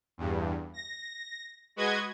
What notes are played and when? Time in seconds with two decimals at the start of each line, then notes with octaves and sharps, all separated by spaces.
0.18 E2 G2
0.74 A#6
1.76 G#3 F#4 B4 D#5 G#6